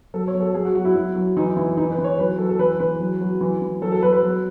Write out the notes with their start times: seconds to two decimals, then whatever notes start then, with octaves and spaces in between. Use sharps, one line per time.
0.14 F#3 A4
0.28 C#5
0.34 F#3
0.40 A4
0.54 F#3 G#4
0.65 F#4
0.75 F#3 F#4
0.85 E4
0.95 F#3 E4
1.16 F#3
1.37 E3 D#4
1.57 E3 E4
1.77 E3 D#4
1.91 B4
1.98 E3
2.04 C#5
2.18 F#3 B4
2.38 F#3 A4
2.49 A4
2.59 E3 B4
2.80 E3 B4
3.00 F#3
3.21 F#3
3.41 E3
3.61 E3
3.82 F#3 A4
3.92 A4
4.02 F#3 B4
4.13 B4
4.23 F#3